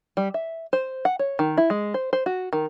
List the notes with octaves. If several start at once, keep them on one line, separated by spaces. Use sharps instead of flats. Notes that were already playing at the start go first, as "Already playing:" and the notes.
G3
E5
C5
F#5
C#5
D#3
E4
G#3
C5
C5
F#4
D#3